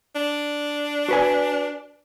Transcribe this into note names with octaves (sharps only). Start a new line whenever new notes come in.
D4
F#4 B4 G#5